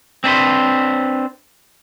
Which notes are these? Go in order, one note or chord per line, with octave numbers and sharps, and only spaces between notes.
C4 D4 B4 C5